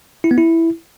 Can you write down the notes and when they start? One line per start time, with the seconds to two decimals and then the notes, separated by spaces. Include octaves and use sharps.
0.24 E4
0.31 B3
0.38 E4